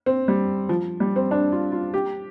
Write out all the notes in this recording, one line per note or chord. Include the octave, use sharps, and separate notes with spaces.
C4
G3
F3
G3
C4
D4
F4
F4
G4